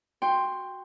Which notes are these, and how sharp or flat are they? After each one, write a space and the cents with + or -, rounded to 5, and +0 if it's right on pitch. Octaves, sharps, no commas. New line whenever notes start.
F#4 +0 G5 +15 C6 +0